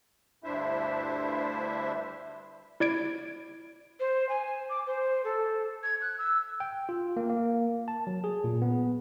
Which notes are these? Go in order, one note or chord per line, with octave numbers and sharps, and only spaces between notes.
D2 G2 D4 E4 C5 E5
E4 D5 G#6 D7
C5
G#5
D6
C5
A4
G#6
F#6
E6
G5
F4
A#3
A#3
A5
F#3
G#4
A#2
B3